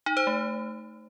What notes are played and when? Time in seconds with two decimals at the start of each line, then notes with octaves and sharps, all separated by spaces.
0.06 D#4
0.17 C5
0.27 A3